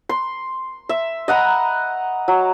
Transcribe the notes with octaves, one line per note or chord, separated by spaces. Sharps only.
C6
E5
D#5 F#5 A#5 B5
F#3